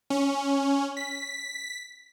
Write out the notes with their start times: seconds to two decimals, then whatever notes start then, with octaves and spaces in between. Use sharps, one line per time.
0.10 C#4
0.97 B6